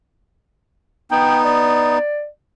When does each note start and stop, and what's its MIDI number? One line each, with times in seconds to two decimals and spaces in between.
1.11 1.98 59
1.11 1.98 63
1.11 1.38 79
1.45 2.27 74